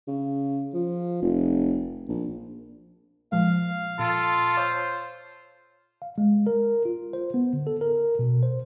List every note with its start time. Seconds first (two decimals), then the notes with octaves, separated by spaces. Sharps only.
0.07 C#3
0.74 F3
1.22 F1
2.08 A#1
3.32 A#2 F3 G#3 F5
3.99 A#2 F4 A4
4.57 C5 C#5
6.02 F5
6.18 G#3
6.47 A#4
6.85 F4
7.13 C5
7.34 B3
7.53 D3
7.67 A4
7.81 A#4
8.19 B2
8.43 C5